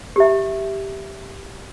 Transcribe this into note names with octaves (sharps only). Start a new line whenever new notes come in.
G4 E5